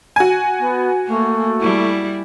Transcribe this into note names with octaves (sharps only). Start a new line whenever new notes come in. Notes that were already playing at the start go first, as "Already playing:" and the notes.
F#4 G#5
B3
A3 A#3
G3 E4